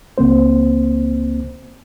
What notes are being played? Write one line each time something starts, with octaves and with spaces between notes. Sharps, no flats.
C#2 A#3 C4 C5